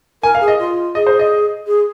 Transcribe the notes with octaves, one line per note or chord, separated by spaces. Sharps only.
A#4 G#5
F5
G#4
D#5
F4
G#4 D#5
C5
D#5
G#4